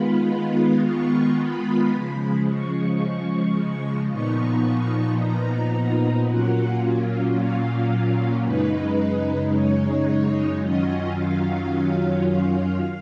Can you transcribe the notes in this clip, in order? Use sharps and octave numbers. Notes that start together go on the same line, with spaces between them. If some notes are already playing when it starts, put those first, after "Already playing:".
Already playing: D#3 G#3 B3 F4 B5
C#6
B5
C#3 F3 G#3
C#6
A#2 F3 B3 D#4 C#6
A#5
A#2 F#3 A#3 C#4 F4 F#5
F5
F#2 C#3 G#3 D#4 B4
C#5
F#2 D#3 F#3 C#4 F4 D#5
F5
F5